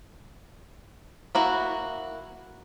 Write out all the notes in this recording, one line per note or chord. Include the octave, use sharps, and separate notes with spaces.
A#3 E4 F#4